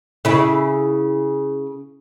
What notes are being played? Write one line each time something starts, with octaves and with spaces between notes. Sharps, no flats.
C#3 E4